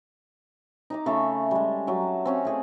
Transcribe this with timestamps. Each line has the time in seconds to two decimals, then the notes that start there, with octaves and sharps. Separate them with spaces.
0.90 D#4 A#5 D6
1.06 C#3 A3 E5 A#5
1.51 G3 G#3
1.87 F#3 E5 A5
2.25 C4 C#4 F5
2.45 A3 G#4 D5